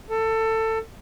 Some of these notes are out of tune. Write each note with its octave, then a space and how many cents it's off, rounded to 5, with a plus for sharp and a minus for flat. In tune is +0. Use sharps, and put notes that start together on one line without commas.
A4 +20